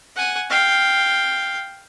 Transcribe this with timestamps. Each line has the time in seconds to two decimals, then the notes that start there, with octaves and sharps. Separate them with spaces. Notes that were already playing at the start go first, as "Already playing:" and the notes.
0.16 F#5 G#5
0.50 F5 G5